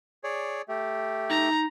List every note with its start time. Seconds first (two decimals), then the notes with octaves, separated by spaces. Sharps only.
0.24 G#4 C#5 D5
0.69 A3 G4
1.29 D#4 A#5